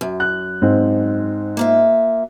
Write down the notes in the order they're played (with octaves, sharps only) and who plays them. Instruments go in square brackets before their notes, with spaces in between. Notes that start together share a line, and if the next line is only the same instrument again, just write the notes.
[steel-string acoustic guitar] F#2
[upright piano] F#6
G#2 C4
[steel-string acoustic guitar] A#3 F4 E5